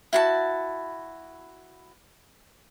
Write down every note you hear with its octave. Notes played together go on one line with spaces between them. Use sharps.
E4 F#4 A5